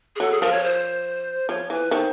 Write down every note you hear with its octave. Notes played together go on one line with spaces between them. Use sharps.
G#4
F#3 A4
G#4
F3 A#4
C#5
C5
F3 C#5
E3 B4
D#3 C5